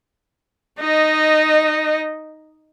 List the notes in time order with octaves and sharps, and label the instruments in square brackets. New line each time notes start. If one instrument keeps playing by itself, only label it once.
[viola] D#4 D#5